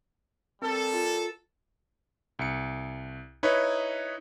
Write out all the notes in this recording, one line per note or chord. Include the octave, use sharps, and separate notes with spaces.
G3 C4 A4 A#4
F4 A#4
C2 C#7
D#4 E4 B4 C#5